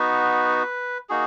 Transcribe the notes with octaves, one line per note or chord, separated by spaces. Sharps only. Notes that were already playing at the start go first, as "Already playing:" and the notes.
Already playing: B3 D#4 F#4 B4
A#3 D#4 F#4 G#4